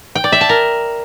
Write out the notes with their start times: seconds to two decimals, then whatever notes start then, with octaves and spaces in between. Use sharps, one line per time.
0.15 G5
0.24 D5
0.32 E5
0.41 A5
0.49 A#4